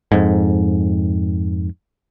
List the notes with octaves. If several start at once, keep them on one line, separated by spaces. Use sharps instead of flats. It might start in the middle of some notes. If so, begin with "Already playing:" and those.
F2 G#2